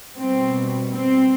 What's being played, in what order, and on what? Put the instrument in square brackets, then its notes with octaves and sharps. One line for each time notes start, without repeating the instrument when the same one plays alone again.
[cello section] B2 G3 C4
C4